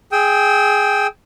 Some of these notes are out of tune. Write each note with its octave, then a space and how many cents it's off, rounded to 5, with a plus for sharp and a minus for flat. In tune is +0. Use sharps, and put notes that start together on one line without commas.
G#4 +0 G5 +0 E6 -40